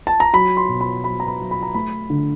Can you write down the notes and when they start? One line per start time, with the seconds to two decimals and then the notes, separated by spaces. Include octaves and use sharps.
0.07 A5
0.20 A#5
0.33 F#3 B5
0.57 C6
0.69 B2
0.81 B5
1.04 F#3 B5
1.20 A#5
1.28 B5
1.39 F#3
1.51 B5
1.63 A#5
1.74 A3 B5
2.10 D3